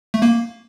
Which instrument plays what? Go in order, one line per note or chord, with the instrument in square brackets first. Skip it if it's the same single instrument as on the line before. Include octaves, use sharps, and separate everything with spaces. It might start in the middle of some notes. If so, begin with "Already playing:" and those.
[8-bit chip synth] A3
A#3